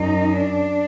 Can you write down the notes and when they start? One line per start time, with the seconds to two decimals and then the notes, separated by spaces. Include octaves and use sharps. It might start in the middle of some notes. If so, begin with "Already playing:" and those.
Already playing: F#2 D#4
0.32 D4